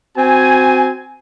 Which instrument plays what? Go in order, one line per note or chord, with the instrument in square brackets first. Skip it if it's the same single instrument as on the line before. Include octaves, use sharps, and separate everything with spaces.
[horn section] C4 F#4 G#5